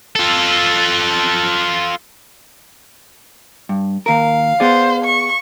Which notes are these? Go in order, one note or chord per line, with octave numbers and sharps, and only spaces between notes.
F4 A4
G2
D#2 A#4 F5
B3 G#4 C5 D5
C#6